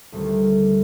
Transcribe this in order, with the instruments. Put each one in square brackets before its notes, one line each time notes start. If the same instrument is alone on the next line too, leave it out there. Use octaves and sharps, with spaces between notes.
[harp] D2 C3 D#3 G3